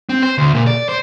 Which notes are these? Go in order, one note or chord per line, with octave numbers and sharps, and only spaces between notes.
C4
C5
D2
A#2
D5
C5